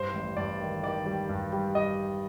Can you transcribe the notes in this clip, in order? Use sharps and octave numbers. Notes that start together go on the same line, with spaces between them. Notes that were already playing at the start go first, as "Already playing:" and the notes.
Already playing: G2 C5
A1
G2 D5
D#3
D#3 D5
G3
G2
G3
G3 D#5